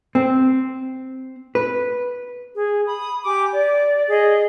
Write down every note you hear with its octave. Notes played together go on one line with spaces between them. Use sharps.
C4
B4
G#4
B5 D#6
G4 G#5 D6
D5
G#4 D#5